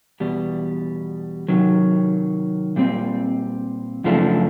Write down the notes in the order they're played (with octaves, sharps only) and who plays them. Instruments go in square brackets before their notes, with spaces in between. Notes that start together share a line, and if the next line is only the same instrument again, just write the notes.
[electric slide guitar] E2 B2 G3
C3 D#3 F#3
A#2 G3 C4
F#2 C#3 F3 A3 D4